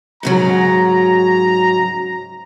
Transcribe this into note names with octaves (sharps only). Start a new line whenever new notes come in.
G#2 C#3 F#3 A#5